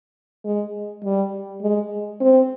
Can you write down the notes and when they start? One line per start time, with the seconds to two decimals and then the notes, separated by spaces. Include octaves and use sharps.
0.45 G#3
1.04 G3
1.62 G#3
2.21 C4